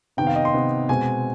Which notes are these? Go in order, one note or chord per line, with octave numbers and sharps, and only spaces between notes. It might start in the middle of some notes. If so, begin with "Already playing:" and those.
C3 D#3 B3 G5
F5
D#5
C6
C3 D#3 B3
B2 G#3 C4 G#5